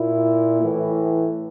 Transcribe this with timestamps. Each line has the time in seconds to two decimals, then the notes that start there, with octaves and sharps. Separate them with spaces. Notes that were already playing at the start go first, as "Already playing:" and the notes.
Already playing: A#2 E4
0.62 A2 E3